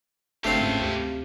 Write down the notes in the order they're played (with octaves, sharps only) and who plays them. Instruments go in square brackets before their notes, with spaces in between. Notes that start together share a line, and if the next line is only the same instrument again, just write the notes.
[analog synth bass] G1 [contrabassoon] D2 [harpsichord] A3 C4 [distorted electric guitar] G4 F5
[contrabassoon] C#2 [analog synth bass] G#2
[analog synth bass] D2 [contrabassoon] C3